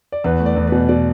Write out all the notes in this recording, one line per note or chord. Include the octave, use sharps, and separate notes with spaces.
D5
E2 B4
A3
D5
E2
B2 B4
B2 D5